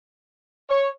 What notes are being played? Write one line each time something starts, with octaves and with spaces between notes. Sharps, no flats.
C#5